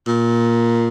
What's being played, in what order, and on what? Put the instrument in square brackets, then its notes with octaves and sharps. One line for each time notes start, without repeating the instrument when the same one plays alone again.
[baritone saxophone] A#2